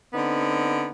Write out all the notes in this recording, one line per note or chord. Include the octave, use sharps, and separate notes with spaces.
D3 B3 C4 D#4